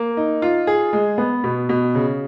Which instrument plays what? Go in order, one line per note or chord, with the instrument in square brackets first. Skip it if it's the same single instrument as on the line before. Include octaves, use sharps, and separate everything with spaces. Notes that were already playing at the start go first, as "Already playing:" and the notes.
Already playing: [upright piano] A#3
D#4
F4
G#4
G#3
B3
B2
B2
C#3